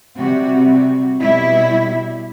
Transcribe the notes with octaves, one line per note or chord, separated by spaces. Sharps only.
C3 G3 F#4
F#4
B2 G3 E4